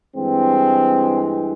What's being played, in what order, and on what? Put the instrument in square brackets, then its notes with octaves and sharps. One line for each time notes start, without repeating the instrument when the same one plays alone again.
[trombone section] G2 E3 G#3 C4